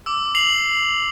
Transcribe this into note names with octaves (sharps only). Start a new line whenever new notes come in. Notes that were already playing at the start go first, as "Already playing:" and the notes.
D6 E6
C7 F7 F#7